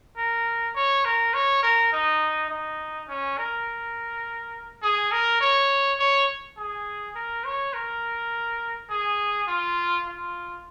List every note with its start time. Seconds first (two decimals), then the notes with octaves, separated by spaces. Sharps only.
0.17 A#4
0.75 C#5
1.05 A#4
1.34 C#5
1.63 A#4
1.92 D#4
2.50 D#4
3.08 C#4
3.38 A#4
4.83 G#4
5.12 A#4
5.41 C#5
5.99 C#5
6.57 G#4
7.15 A#4
7.45 C#5
7.74 A#4
8.90 G#4
9.48 F4
10.06 F4